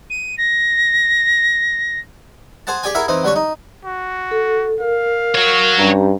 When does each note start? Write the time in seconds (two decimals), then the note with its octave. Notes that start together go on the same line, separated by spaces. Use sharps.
0.10 D#7
0.38 A#6
2.67 G#4 C5 F#5 A5
2.83 G4 G#4 D5 G5 G#5
2.95 E4 G#4 A#4 E5 F#5
3.08 E3 C4 D#4
3.24 D3 G3 F#4 C#5
3.36 D#4
3.85 F#4
4.31 A4
4.80 A#4 F5
5.35 F#4 C#5
5.79 G2 C#4 G4 A#5